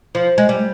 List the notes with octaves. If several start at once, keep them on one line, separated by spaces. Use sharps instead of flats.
F3
G#3
G3